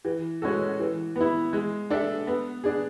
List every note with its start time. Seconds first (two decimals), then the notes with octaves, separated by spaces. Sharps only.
0.05 E3
0.42 G#3 C#4 F#4 A4
0.80 E3
1.16 B3 E4
1.53 G#3
1.90 D4 A4 E5
2.27 B3
2.64 D4 G#4